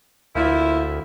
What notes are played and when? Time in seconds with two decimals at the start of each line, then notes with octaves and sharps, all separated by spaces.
0.35 D2 F3 A#3 E4